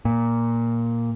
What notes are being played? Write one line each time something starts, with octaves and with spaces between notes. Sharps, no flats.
A#2